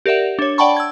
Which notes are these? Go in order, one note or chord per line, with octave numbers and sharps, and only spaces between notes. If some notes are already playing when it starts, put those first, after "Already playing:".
G4 A#4 D5 E5 F#5
D4 C#5
D5 F#5 G5 A5 B5 C#6
E6 G#6